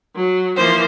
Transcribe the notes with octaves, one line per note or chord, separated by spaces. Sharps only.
F#3
E3 F3 A#3 C5